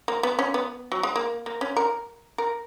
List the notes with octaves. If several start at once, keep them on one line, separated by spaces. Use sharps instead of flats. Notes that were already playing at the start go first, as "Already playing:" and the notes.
A#3
B3
C#4
B3
F#3
G#3
A#3
A#3
C#4
A#4
A#4